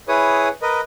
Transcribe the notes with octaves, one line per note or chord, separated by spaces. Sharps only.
E4 G#4 B4 C#5 D#6
A#4 B4 D#5